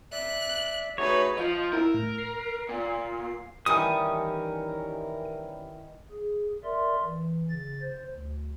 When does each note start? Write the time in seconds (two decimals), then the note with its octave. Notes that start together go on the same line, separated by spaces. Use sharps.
0.12 D5 E5 F#6
0.98 A3 D#4 F#4 G#4 B4 C#5
1.37 F3 D#5
1.73 E4 A#4 E6
1.94 A2
2.18 C7
2.69 A#2
3.66 D#3 E3 G3 C#4 A#4 D#6
6.11 G#4
6.64 A#4 D5 E5 C6
7.04 E3
7.49 C#3 A6
7.82 C5
8.11 D2